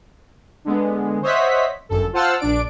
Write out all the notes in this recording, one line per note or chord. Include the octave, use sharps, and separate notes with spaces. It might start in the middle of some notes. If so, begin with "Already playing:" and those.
D3 G#3 B3
C5 C#5 D#5 E5 F#5 B6
G1 F#2 A4
F4 C5 F#5 A5 E6 F6
A#1 D4 D5 D7